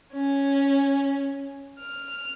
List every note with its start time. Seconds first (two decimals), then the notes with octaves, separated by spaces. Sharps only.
0.13 C#4
1.80 F6